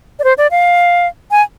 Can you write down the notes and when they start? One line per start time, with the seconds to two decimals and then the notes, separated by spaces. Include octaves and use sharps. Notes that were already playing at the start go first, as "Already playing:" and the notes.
0.19 D5
0.24 C5
0.38 D5
0.51 F5
1.31 G#5